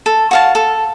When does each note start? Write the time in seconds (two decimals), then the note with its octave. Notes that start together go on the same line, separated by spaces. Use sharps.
0.06 A4
0.31 F#4 F5 A5
0.55 A4